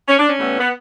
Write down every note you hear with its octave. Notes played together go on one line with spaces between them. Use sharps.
C#4
D4
C#4
A2 E3 G3 B3
B3